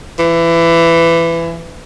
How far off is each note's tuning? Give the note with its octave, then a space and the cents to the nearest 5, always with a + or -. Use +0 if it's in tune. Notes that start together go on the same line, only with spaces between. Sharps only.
E3 +20